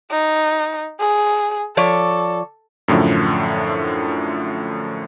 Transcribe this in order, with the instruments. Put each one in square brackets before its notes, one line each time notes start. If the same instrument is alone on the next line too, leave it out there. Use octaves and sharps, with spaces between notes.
[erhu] D#4
G#4
[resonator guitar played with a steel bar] F3 C#5 D5 [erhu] A4
[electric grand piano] F#2 A2 D3 F3